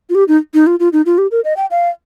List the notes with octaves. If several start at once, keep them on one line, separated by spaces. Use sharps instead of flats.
F4
G4
D#4
D#4
F4
F4
D#4
F4
G4
A#4
D#5
G5
F5